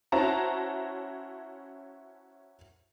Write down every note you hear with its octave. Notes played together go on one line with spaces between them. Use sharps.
C#4 E4 F#4 C5 A5 A#5